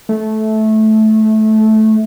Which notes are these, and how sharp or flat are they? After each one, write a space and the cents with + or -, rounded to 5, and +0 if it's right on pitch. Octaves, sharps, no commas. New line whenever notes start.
A3 -15